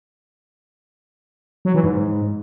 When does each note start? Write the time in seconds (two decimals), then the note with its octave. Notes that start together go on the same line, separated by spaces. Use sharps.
1.65 F#3
1.74 E3
1.84 G#2